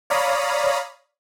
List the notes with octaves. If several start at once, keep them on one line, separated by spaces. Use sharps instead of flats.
C#5 D5 F5 A#5 B5 D#6